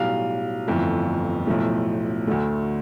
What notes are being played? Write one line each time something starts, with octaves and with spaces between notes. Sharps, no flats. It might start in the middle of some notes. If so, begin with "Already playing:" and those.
Already playing: B1 A2 G3 F5
G1 F2 E3 A3
B1 A2 F3 A3
D2 D3 A3